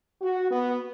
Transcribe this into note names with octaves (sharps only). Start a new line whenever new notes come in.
F#4
B3